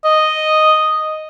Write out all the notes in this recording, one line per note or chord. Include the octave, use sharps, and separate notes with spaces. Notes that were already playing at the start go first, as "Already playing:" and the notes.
D#5